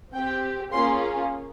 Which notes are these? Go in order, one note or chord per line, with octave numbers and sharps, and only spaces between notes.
C4 G4 G5
A#3 C#4 F4 G#4 C6